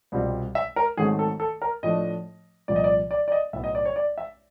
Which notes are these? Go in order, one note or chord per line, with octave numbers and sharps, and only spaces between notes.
C2 B2 G3 C4 F4
E5
A#4
G#2 D#3 F#3 A3 C4 G#4
A4
A4
A#4
A2 F3 A3 D4 D#5
C2 A#2 F3 D5
D#5
D5
D5
D5
D#5
B1 A2 F#3 B3 E5
D#5
D5
C#5
D5
E5